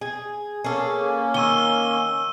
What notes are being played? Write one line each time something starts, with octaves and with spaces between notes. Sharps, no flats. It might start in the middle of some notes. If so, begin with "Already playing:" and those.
G#4
A#3 C#4 G#4 A4
D#3 E6 D#7 G7